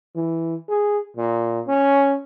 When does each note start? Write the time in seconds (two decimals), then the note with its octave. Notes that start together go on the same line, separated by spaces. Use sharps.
0.16 E3
0.69 G#4
1.17 A#2
1.68 C#4